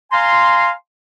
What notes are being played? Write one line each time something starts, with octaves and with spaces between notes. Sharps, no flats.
F5 G#5 A#5 C6